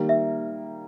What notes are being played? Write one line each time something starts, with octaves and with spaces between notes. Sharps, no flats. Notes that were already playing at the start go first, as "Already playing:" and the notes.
Already playing: D#3 G3 A#3
E5